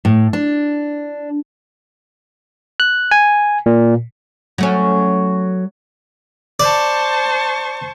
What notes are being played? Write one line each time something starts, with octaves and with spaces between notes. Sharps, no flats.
A2
D4
F#6
G#5
A#2
F#3 A3 C#4
C5 D5 A5 C#6